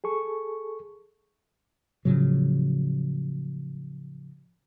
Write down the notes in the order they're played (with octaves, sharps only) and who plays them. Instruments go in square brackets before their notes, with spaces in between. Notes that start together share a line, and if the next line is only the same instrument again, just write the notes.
[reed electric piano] G#4 A4 C#6
[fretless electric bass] A2 C#3 F3 F#3